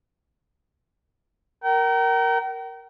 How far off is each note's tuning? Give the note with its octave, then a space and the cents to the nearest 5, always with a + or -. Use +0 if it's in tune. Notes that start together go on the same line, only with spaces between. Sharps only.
A#4 +0 G5 -40